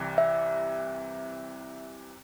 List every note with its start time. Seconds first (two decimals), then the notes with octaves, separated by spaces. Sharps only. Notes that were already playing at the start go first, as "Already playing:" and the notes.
Already playing: C2 C3 E3
0.18 E5